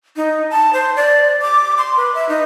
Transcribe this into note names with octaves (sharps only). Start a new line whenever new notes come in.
D#4
A5
C5
D5
D6
C6
B4
E5
D#4